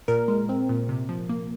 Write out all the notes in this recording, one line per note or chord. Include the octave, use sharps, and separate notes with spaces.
A#2 A#4
G#3
C4
A#2
C3
F3
A#3